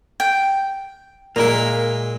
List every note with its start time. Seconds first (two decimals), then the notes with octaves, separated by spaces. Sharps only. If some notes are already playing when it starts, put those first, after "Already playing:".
0.20 G5
1.36 A#2 G#3 A#3 E4 A#4